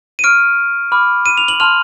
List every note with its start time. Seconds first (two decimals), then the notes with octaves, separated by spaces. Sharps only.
0.19 D#7
0.24 C#6 F6 D7
0.92 B5 D6 F6
1.26 D#7
1.37 F7
1.48 F#7
1.60 A5 C6 F6 F7